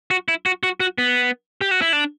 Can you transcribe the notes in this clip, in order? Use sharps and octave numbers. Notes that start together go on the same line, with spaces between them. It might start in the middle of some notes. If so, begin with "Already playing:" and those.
F#4
E4
F#4
F#4
F#4
B3
G4
F#4
E4
D4